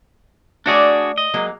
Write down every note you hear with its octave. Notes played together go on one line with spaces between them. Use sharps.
A3 D4 F#4 G#4 C#5 D5
D#5
F#3 G#3 A#3